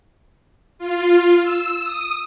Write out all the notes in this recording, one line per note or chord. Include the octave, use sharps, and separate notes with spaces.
F4
E6
D#6